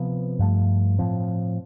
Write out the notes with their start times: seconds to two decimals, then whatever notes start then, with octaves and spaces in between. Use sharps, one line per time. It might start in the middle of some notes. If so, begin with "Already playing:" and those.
Already playing: C3 F3 B3
0.39 G2 F3 A3
0.99 A2 F3 C4